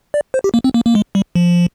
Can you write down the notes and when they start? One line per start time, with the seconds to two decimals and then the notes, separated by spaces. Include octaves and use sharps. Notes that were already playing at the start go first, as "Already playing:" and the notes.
0.14 D5
0.34 C5
0.44 G4
0.54 A#3
0.64 C4
0.74 A#3
0.86 A#3
0.95 G#3
1.15 G3
1.35 F3